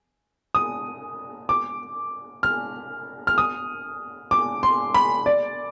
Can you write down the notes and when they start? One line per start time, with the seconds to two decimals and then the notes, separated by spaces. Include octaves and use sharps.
0.55 D#6
1.49 D6
2.43 F6
3.27 F6
3.38 D#6
4.31 D6
4.63 C6
4.94 B5
5.26 D5